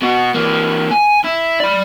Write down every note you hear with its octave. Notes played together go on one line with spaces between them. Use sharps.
B2 F#4
E3 A#3
G#5
E4
D5 B5